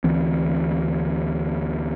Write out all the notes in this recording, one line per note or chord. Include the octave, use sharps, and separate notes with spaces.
D2 E3 C4